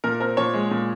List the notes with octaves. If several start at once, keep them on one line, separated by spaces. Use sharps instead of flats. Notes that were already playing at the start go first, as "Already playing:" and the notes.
A#2 A#4
C4 A#4
A#2 C#5
G#3
A#2